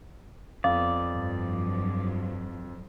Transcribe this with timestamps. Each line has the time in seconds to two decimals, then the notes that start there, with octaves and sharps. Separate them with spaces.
0.64 F2 B3 D5 F5
1.12 G2 F3 F#3